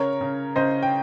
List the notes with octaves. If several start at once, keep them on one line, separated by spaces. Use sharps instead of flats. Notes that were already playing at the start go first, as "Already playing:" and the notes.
Already playing: C#3 A#4 C#5
C#3
C#3 C5 D#5
G5